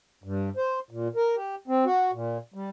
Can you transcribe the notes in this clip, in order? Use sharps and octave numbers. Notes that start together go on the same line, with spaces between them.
G2
C5
A#2
A#4
G4
C4
F#4
A#2
G3